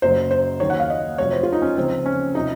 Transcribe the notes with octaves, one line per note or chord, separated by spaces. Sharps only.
F#1 F#2 C#3 F#3 C5
C5
D#2 D#3 F#3 C#5
F#5
F5
D#5
F1 F2 C3 F#3 C#5
C5
F4
D#4
C#4
C#2 C#3 F3 C4
C#4
C3 F3 D#4